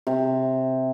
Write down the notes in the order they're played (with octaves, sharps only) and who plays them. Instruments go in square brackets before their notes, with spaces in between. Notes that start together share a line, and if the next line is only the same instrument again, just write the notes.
[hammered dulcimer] C3